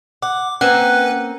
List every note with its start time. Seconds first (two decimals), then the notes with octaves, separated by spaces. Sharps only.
0.22 F#5 D6
0.61 A#3 C4 C#4 B4 F#5 F#6